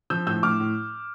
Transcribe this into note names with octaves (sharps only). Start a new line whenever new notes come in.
F3 E6 G6
A2 E6 G6
A2 D6 F6
A2